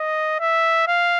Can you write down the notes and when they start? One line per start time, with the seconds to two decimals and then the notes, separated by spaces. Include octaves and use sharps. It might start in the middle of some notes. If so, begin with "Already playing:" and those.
Already playing: D#5
0.40 E5
0.88 F5